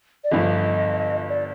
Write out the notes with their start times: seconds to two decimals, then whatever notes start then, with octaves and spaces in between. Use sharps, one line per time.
0.24 D5
0.31 G1 G2 F3 D#5
1.29 D5